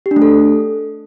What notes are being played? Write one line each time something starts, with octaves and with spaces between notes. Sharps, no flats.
G4
D4
A3
A4